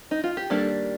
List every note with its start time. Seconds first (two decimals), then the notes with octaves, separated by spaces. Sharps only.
0.11 D#4
0.24 F4
0.37 G4
0.50 D#3 G3 A#3 D4 A4